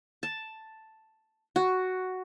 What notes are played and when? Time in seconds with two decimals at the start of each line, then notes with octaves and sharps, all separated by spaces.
0.23 A5
1.56 F#4